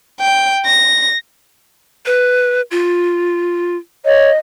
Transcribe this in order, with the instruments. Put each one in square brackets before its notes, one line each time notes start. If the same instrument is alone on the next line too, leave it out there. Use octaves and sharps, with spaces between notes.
[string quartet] G5
A#6
[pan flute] B4
F4
[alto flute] C#5 [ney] D#5